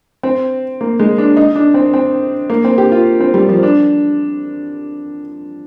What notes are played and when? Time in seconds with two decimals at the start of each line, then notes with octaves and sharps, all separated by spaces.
0.23 C4
0.81 A#3
0.99 G#3
1.18 D4
1.37 D#4
1.56 D4
1.74 C4
1.94 C4
2.50 A#3
2.65 C4
2.78 G4
2.92 F4
3.21 C4
3.34 G3
3.49 F3
3.63 D4